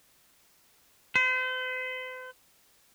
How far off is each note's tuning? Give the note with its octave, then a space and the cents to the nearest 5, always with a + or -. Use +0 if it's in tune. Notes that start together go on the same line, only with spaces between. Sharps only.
C5 -40